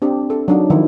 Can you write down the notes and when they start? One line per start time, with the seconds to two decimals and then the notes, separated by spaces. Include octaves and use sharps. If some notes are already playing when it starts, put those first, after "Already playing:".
0.02 C4 D4 G4
0.30 A4
0.48 F#3 D4 D#4
0.70 D#3 F3 F#3 E4